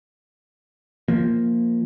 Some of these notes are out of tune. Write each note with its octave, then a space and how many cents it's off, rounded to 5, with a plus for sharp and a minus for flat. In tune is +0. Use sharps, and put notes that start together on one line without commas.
F3 +0 A#3 +0